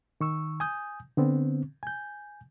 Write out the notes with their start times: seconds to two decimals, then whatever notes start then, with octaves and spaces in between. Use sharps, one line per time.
0.21 D#3 C#6 E6
0.60 G#5 D#6 G6
1.17 D3 B3 C4
1.83 G#5 G6